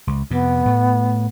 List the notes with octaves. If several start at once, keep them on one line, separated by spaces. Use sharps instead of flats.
C#2
F2 C3 B3
A2 A3